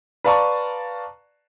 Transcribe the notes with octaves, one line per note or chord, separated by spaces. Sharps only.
B4 D5 F5 A5 A#5 C#6